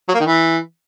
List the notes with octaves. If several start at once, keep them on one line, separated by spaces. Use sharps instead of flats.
F#3
A#3
D#3
E3